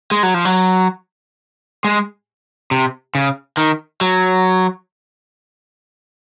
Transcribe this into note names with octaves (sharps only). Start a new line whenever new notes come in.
G#3
F#3
F3
F#3
G#3
C3
C#3
D#3
F#3